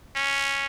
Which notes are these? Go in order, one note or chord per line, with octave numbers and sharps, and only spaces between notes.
C#4